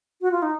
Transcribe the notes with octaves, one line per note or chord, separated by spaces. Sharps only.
F#4
F4
D#4